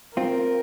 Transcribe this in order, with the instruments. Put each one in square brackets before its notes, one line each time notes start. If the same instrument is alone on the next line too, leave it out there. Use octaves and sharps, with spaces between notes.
[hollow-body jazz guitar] C4 F4 [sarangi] A#4